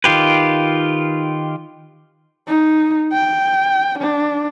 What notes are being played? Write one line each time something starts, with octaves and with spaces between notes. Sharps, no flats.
D#3 F4 G4 B4
D#4
G5
D4